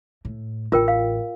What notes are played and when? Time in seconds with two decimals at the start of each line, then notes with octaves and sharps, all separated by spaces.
0.25 A2
0.72 A1 F4 A#4 G5
0.88 F5